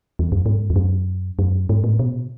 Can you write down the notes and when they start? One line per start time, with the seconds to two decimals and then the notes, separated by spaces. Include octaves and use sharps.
0.19 E2
0.32 F#2
0.46 G#2
0.70 E2
0.76 F#2
1.39 F#2
1.69 G#2
1.84 A2
1.99 B2